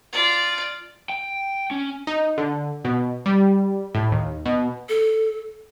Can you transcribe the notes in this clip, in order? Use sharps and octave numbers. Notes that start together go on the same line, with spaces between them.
F4 D5
G5
C#4
D#4
D3
B2
G3
A2
D#2
B2
A4